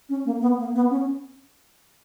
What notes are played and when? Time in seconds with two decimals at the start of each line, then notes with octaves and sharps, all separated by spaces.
0.09 C#4
0.25 A#3
0.41 B3
0.58 A#3
0.75 B3
0.90 C#4